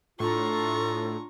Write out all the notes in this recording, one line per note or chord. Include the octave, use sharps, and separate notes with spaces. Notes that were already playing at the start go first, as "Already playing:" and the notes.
A2 D4 F4 A4 A#5 C#6